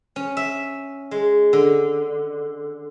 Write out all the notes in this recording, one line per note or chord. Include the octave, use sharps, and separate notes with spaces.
C#4
E5
G#3
D3